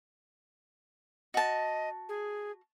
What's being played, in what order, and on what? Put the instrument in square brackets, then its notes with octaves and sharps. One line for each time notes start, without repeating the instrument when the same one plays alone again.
[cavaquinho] F#4 A5 [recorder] D#5
[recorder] G#4